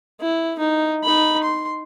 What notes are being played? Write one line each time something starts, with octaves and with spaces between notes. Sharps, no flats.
E4
D#4
D#4 B5
C6